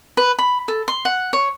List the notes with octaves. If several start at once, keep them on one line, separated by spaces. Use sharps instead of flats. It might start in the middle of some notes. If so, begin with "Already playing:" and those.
B4
B5
A4
C6
F#5
C#5